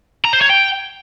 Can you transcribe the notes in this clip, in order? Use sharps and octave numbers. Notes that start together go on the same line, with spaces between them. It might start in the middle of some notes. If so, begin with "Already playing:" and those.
A#5
C5
C#5
G5